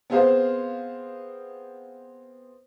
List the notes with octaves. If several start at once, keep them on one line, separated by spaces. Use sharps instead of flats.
B3 C4 G#4 C5 F5